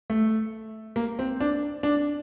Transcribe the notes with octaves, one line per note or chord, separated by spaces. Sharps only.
A3
A#3
C4
D4
D4